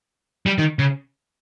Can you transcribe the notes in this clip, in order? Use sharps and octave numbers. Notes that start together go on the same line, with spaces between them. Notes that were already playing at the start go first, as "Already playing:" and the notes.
G3
D#3
C#3